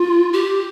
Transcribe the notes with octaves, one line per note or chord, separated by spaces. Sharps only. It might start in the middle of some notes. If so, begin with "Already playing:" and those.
Already playing: F4
G4